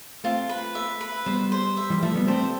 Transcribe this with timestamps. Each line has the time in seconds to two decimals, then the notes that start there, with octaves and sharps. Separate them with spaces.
0.24 A3 C4 F4
0.49 B4
0.75 E5
1.01 B4
1.26 G3 B3 C5
1.52 C5
1.77 E5
1.90 E3 G3
2.03 F3 A3 E5
2.15 G3 B3
2.28 A3 C4 C5